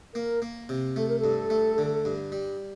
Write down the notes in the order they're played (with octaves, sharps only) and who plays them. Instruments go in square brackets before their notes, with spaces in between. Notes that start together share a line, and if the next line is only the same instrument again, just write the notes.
[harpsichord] A#3 [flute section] A#4
[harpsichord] A#3
C3
[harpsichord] A3 [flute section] A4
[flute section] A#4
[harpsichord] G2 [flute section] A4
[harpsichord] A3
D3
G2
G3